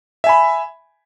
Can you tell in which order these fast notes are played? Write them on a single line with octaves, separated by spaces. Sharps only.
E5 G#5 B5